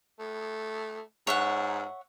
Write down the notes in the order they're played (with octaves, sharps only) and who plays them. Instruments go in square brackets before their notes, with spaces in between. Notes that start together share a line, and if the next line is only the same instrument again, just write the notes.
[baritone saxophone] A3
[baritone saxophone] G#2 [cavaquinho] C#5 E5 F#5